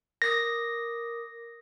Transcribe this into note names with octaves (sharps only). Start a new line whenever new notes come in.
A#4 D6 D#6 A#6